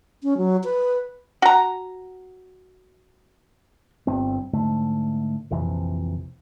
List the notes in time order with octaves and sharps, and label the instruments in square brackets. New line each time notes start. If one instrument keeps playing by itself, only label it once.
[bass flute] C#4
F#3
B4
[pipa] F#4 A#5
[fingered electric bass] G1 G2 C4
G#2 D3 A3
A#1 F2 C3 E3